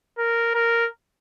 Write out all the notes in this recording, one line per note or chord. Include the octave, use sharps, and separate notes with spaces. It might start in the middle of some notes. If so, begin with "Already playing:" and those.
A#4
A#4